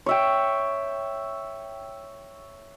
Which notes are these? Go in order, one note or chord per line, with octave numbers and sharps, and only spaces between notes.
C#5 E5 G5